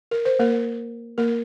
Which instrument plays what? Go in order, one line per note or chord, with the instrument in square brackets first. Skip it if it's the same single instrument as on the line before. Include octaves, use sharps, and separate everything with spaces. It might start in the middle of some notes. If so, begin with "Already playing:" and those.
[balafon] A#4
C5
A#3 A#4
A#3 A#4